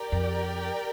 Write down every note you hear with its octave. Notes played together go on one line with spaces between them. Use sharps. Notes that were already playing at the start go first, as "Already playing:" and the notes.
Already playing: G4 A#4 D5 G5
F2